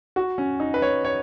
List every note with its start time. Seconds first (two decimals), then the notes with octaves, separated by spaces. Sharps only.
0.16 F#4
0.38 C#4
0.60 D#4
0.74 B4
0.82 C#5
1.05 C#5